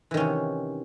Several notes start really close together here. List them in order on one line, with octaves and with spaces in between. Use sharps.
E3 D#3 C#4 C3